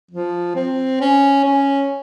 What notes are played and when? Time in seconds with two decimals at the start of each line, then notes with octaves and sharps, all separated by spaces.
0.11 F3
0.56 C4
1.01 C#4
1.45 C#4